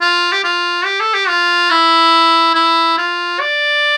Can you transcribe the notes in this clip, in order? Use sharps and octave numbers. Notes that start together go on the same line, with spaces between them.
F4
G4
F4
G4
A4
G4
F4
E4
E4
F4
D5